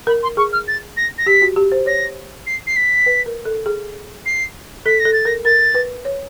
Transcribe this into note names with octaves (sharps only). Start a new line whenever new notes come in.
A#4 B5
C6
G#4 C#6
F6
A6
A#6
A#6
G4 B6
F#4
G4
C5
C#5 A#6
C7
C7
B6
B4
A#4
A4
G#4
C7
A4 B6
A#6
A4
A6
A#4 A#6
A#4 A6
B4
C#5